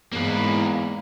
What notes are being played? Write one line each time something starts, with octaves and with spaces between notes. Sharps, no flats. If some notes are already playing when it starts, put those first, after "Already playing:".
E2 G#2 A#3 E4 B4